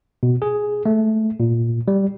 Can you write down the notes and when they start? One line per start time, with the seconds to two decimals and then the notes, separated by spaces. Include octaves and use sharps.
0.23 B2
0.42 G#4
0.86 A3
1.40 A#2
1.88 G3